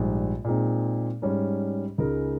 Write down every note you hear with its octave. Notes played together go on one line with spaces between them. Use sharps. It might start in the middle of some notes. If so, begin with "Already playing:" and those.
Already playing: A#1 G#2 G3
A#2 G#3 C4 D#4
G#2 G3 C#4
C#2 C#3 G#3 D#4 A#4